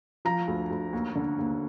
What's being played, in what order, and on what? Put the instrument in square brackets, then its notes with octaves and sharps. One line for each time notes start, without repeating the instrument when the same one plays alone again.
[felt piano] F3 A#5
D2
D2
D#2
D3
D#2